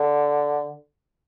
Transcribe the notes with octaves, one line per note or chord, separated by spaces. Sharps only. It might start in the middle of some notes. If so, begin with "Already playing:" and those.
Already playing: D3